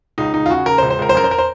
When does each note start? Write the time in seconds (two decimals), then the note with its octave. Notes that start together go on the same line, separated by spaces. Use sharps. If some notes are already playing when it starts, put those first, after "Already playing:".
0.18 C#2 D#4
0.34 C#2 D#4
0.46 F4
0.50 C#3 F#4
0.66 C#3 A#4
0.78 C5
0.82 C#2
0.90 C5
0.99 C#2 A#4
1.09 C5
1.14 F#2 A#4
1.24 C5
1.31 A#4
1.38 C5